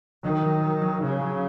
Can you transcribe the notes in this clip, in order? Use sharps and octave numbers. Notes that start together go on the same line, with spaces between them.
D#3 F#3
F#3
F#3
F#3
C#3 C#4
F#3